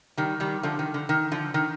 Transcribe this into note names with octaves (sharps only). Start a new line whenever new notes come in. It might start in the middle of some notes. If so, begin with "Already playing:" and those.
D#3 G3
D#3 G3
D3 F3
D#3
D3
D#3
D3 F3
D#3